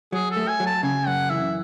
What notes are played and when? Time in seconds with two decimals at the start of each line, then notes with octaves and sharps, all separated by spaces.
0.12 F#3 G#4
0.31 A4
0.37 A3
0.48 G#5
0.60 F#3
0.66 A5
0.83 C#3 G#5
1.07 F#2 F#5
1.30 E3 E5